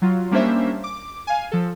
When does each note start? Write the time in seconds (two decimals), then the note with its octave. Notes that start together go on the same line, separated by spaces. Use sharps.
0.02 F#3 F4
0.31 G3 A#3 C#4 D4 C5 E5
0.84 D6
1.27 F5 G#5
1.52 F3 A4